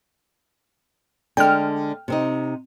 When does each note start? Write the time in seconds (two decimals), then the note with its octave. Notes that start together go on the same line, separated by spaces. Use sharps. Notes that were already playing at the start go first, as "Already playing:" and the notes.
1.37 D3 G#3 D4 G5 F6
2.08 C3 C4 D#4